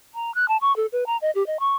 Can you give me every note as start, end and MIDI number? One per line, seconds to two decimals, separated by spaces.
0.14 0.33 82
0.35 0.47 90
0.48 0.57 81
0.61 0.75 85
0.76 0.86 69
0.92 1.04 71
1.06 1.17 82
1.22 1.31 75
1.35 1.45 67
1.46 1.58 75
1.60 1.76 85